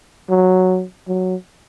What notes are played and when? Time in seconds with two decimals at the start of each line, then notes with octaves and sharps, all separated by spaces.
0.29 F#3
1.08 F#3